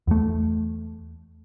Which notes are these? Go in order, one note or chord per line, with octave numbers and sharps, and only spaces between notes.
E2 A3